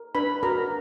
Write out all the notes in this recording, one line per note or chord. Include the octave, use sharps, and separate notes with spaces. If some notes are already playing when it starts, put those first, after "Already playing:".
Already playing: A#4
D4 B4 B5
F#4 A#4 A#5